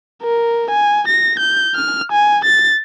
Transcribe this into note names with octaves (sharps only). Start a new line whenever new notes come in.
A#4
G#5
A#6
G6
F6
G#5
A6